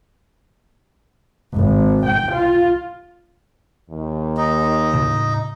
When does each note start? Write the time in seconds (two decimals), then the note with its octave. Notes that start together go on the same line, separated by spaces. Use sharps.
1.56 G#1
2.04 G5
2.33 F4
3.90 D#2
4.37 D#4
4.94 A2 C#3